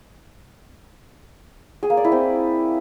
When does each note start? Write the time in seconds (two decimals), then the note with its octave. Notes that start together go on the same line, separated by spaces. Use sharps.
1.83 G#4
1.90 A#3
1.97 D5
2.04 E4
2.12 C4